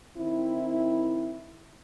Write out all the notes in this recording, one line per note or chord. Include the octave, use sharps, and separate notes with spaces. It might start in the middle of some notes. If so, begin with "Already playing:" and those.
D#3 C4 E4